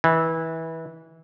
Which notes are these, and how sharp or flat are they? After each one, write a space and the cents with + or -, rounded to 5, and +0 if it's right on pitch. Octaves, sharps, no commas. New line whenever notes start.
E3 -20